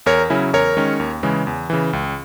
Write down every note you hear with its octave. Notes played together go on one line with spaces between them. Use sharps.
E2 A#4 C#5
C#3 F#3 C#4 E4
E2 A#4 C#5
D#3 G#3 C#4
D#2
C#3 E3 G#3
E2
C#3 E3
C#2